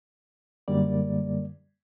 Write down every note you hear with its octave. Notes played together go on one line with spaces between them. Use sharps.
F#2 D3 G3 A#3 D5